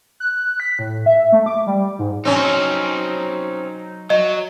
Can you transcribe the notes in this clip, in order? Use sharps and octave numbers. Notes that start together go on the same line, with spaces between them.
F#6
B6
A2
E5
A3
D6
G3
G#2
F#3 C4 C#4 D#4
F#3 D#5